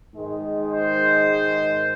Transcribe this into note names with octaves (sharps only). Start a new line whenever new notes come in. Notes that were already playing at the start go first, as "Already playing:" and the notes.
G#2 D#3 G#3
C5